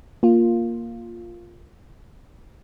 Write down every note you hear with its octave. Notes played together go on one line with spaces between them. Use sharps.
A#3 F4